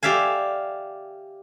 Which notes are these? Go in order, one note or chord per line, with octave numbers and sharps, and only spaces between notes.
G4 D5 E5 F5 G#5